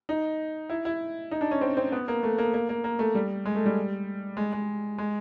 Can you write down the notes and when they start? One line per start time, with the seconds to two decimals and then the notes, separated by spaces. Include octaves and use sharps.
0.09 D#4
0.70 E4
0.85 E4
1.31 D#4
1.41 D4
1.51 C#4
1.61 C4
1.77 C4
1.92 B3
2.08 A#3
2.23 A3
2.38 A#3
2.54 A#3
2.69 A#3
2.84 A#3
2.99 A3
3.15 G3
3.45 G#3
3.55 A3
3.66 G3
4.37 G#3
4.53 G#3
4.98 G#3